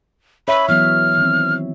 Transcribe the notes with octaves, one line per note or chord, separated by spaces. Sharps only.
C#5 E5 B5
E3 F#3 B3 F6
D#3 E3 C4